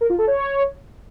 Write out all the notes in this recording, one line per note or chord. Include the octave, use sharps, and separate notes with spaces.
A#4
F4
A4
C#5